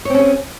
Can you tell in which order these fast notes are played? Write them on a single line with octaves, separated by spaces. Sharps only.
C#5 C4 C#4 G#4